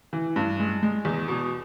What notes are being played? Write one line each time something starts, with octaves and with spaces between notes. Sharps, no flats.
E3
G2
G#3
G#3
E2
B2